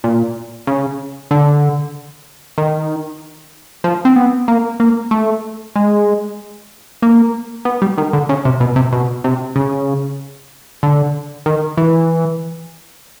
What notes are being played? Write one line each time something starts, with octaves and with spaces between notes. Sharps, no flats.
A#2
C#3
D3
D#3
F3
C4
B3
A#3
A#3
A3
G#3
A#3
B3
G3
D#3
D3
C#3
C3
B2
C3
B2
C3
C#3
D3
D#3
E3